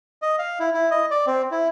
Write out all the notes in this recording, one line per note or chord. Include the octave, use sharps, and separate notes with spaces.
D#5
F5
E4
E4
D#5
D5
C4
E4